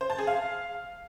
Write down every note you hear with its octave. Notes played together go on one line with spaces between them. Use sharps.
C5
A5
G#4
F5